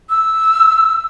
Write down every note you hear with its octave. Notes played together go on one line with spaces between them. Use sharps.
E6